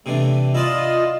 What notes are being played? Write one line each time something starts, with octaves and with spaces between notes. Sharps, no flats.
C3 E3 A3 D4
E4 F4 D5 D#5 A5